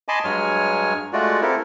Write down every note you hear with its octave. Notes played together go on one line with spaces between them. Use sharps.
D#5 G#5 A5 B5 C6 D6
G2 F#3 G#3 C#5 G#5 F6
G#3 A3 F4 F#4 D5
C4 E4 G4 A4 A#4